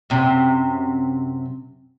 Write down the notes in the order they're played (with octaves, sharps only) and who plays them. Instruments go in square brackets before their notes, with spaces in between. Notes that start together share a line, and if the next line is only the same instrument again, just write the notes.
[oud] F#2 C3